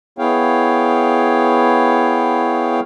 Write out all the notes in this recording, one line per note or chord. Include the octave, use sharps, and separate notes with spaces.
B3 E4 G#4 C#5 F5 G5